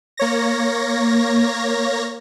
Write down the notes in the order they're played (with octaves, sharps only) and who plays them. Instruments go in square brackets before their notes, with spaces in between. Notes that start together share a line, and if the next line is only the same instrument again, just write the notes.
[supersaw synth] A#3 C#5 A#6